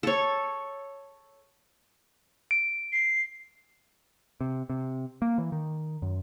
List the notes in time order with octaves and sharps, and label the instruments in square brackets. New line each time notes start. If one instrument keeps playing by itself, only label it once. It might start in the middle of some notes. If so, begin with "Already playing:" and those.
[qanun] A4 C#5
[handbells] D7
[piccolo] C7
[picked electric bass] C3
C3
A#3
E3
D#3
F#2